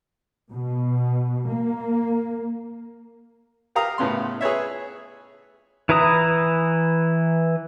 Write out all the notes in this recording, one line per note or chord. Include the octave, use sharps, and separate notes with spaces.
B2
A#3
G4 A#4 F5 A#5 D#6
A2 C#3 B3 C6
G#4 B4 C#5 E5
E3 E4 B4 A#5 D#6